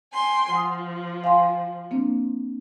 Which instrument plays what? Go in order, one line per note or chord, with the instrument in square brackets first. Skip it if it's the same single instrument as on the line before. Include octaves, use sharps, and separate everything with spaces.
[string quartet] G5 G#5 C6
[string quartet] F3 [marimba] F#5 D#6
[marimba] F5 G#5 C6
A#3 C4 D4